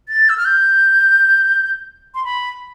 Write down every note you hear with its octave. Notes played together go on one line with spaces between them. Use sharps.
A6
E6
F6
G6
C6
B5